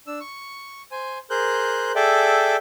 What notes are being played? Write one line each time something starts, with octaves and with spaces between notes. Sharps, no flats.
D4 E6
C#6
C5 G#5
G#4 A#4 C5 F#6 G6
G#4 A4 D5 E5 G5